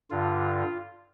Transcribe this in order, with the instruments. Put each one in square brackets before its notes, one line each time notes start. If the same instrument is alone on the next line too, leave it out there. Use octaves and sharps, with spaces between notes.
[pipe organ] G2 D3 F4